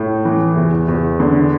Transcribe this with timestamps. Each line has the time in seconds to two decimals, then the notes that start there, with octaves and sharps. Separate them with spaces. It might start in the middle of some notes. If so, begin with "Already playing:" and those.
Already playing: A2
0.25 E3
0.57 E2
0.88 E2
1.20 D3